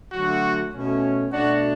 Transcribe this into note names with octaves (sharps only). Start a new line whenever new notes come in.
D3 F#3 A3 F#4
B2 A3 C#4
B2 A3 D4 F#4